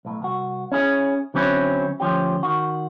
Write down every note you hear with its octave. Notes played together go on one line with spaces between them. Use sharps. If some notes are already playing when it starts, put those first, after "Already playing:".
B1 A2
C2 F#4
C#4 E4 G#4
D3 F#3 C4 C#4 E4
D2 F3 C#4 G4
D#3 F#4